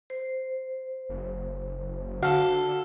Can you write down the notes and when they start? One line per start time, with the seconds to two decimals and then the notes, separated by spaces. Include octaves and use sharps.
0.10 C5
1.09 F#1
2.23 D3 F#4 A4 F5